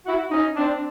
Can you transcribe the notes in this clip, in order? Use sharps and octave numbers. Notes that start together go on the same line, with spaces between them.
E4 F#4
C#4 D#4
C4 D4